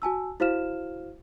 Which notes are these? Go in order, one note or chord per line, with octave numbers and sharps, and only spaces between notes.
F#4 G#5 A5 E6
E4 F#4 C5 F5 F6 E7